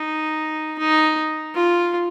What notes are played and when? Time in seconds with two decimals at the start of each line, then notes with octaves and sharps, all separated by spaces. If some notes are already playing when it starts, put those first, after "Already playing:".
Already playing: D#4
0.79 D#4
1.55 F4